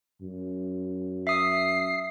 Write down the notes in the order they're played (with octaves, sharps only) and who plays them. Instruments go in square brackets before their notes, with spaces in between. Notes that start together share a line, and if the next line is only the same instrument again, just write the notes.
[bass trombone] F#2
[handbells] E5 D#6 [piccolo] C7